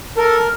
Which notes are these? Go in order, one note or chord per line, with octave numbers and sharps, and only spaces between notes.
A4 A#4